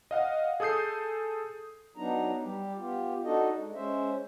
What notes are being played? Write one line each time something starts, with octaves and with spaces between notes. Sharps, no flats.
D#5 F5 F#5
G#4 A4 D#6 G6 C7
F#3 B3 D4 D#4 A#5
G3 G4
B3 F4 G4
D4 D#4 F#4 A4 D#5
G#3
G#3 C#4 C5 E5